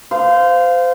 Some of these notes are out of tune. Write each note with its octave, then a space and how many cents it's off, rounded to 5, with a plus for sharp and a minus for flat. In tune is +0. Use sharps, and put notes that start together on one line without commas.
C5 -25 F5 +0